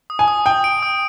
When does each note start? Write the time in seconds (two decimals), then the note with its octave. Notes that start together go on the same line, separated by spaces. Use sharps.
0.10 D#6
0.19 G#5
0.28 D#6
0.46 G5 D#6
0.64 D7
0.83 D#6